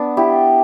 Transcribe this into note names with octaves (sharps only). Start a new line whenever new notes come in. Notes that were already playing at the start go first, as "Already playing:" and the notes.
Already playing: B3 D4
E4 G4